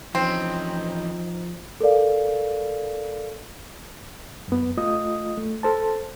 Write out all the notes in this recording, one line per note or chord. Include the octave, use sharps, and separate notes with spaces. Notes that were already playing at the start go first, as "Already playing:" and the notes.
E3 F3 C4 C#4 D#4
A4 A#4 D5 F5
F#2 B3
A3 F4 D#5 D#6
A3
A4 C5 A5